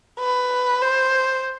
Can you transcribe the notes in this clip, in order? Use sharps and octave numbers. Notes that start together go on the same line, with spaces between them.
B4
C5